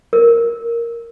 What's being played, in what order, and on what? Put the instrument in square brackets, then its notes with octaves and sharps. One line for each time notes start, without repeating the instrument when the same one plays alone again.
[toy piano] A#4